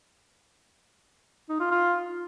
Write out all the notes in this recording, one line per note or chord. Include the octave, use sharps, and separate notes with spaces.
D#4
F4
F4